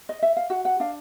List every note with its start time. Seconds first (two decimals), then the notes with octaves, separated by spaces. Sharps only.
0.09 D#5
0.22 E5
0.37 F5
0.50 F#4 F#5
0.65 F#5
0.80 D4 F5